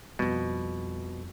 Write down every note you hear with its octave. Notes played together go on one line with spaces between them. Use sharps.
F2 B2 G3